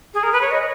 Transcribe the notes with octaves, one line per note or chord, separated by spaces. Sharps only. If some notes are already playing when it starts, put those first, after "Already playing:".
G#4
A#4
B4
C#5
D#5